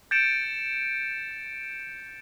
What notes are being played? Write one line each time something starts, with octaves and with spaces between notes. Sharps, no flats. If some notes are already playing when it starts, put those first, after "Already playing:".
G6 A6 C#7 D7 E7